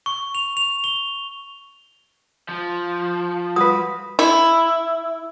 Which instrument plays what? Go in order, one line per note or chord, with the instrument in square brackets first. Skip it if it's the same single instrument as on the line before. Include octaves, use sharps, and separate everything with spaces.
[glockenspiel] C#6
F7
F7
G7
[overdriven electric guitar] F3
[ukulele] F#4 B4 [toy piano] D#6
[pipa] E4